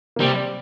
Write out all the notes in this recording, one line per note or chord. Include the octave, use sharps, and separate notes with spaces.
A#3
C3 G3 C4